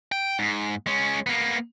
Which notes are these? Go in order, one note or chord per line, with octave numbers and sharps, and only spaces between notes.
G5
G#2
G#3 C#4
A#3 B3